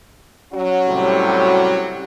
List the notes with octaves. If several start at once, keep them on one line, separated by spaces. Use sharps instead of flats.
F#3 C#4 F#4
A2 C3 G3